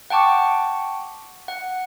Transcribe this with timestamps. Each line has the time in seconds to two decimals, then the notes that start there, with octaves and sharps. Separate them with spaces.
0.10 F#5 G5 A5 C#6 D6
1.48 F#5